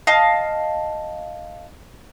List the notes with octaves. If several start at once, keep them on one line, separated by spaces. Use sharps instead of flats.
D#5 F5 A5